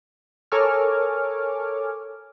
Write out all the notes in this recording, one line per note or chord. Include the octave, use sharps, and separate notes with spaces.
A4 A#4 C#5 G#5 D6 F6